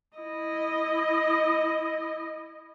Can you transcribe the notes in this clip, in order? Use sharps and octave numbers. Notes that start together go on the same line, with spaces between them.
E4 D#5